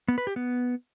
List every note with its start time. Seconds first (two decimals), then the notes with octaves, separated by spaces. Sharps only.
0.08 B3
0.18 B4
0.27 G4
0.36 B3